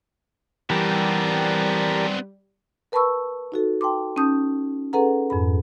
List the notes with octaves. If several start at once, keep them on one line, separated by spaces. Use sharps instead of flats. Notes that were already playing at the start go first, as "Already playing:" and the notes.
E3 G3 B3 C4 G4 A#4 A5
A#4 B4 A5 B5 C#6 E6
D#4 F#4 A4
G5 A5 C6 D6
C#4 D#4 A5 D#6 G6
C#4 G#4 A4 B4 F#5 A#5
F2 G#2 B5